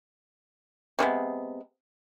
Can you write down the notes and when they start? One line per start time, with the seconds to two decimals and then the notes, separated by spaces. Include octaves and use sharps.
0.99 C3 E3 G#3 B3